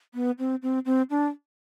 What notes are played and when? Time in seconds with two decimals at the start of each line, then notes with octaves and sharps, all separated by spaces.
0.14 B3
0.39 C4
0.63 C4
0.86 C4
1.10 D4